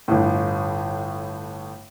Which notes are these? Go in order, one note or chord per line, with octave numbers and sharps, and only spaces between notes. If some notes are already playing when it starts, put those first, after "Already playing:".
G1 A2